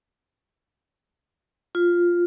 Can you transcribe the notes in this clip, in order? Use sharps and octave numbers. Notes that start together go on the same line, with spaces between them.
F4